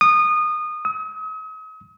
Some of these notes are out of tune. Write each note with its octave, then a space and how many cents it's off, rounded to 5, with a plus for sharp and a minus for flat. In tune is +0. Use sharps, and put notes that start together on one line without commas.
D#6 -25
D#6 +40